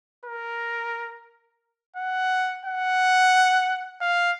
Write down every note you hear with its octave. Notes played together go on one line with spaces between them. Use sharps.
A#4
F#5
F#5
F5